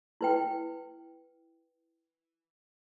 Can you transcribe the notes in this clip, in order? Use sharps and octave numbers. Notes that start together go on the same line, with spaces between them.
E4 B4 G5